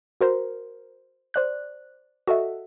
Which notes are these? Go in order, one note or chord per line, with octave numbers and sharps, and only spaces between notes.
F#4 A#4 C5
C5 D5 F#6
F#4 A4 D#5 E5